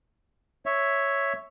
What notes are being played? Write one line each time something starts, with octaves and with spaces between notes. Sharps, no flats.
C#5 E5